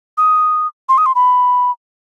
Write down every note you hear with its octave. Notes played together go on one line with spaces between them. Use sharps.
D#6
C6
D#6
C6
B5